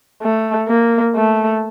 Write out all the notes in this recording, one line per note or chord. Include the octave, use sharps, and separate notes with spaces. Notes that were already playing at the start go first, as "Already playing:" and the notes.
A3
A#3
A3